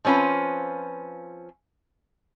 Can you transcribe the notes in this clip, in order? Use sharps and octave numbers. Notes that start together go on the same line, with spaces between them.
F3 C4 C#4 F4 B4